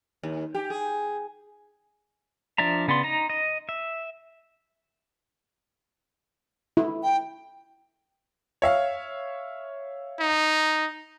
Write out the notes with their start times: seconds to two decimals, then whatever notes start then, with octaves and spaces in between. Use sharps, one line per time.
0.23 D#2
0.55 G4
0.70 G#4
2.58 F3 D4 D5 E5 A#5
2.88 C#3 B3 D5 C6
3.03 D#4 A#5
3.30 D#5
3.69 E5
6.77 E4
7.03 G5
8.62 C#5 E5 F5
10.20 D#4